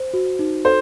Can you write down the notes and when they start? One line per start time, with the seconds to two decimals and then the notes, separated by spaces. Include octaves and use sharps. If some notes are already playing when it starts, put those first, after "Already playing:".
Already playing: C5
0.14 F#4
0.39 D#4
0.65 A4 C5